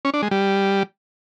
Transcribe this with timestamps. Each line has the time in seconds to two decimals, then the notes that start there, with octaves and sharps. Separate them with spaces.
0.05 C#4
0.14 D4
0.22 G#3
0.31 G3